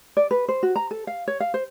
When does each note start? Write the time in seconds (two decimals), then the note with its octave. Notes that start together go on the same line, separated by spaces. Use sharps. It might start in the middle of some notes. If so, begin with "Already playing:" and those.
0.17 D5
0.31 B4
0.49 C5
0.63 F#4
0.76 A#5
0.91 A4
1.07 F5
1.28 C#5
1.40 F5
1.54 C5